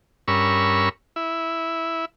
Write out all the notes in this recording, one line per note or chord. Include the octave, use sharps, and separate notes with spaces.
G2 C#4 A#4 B5 C#6 E6
E4